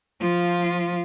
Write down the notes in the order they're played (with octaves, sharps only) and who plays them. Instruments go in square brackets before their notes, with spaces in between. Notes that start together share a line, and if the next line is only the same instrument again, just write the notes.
[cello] F3 F4